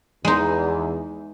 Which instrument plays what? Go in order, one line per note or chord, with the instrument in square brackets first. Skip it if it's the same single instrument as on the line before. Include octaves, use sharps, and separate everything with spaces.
[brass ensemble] E2 [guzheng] G#3 D#4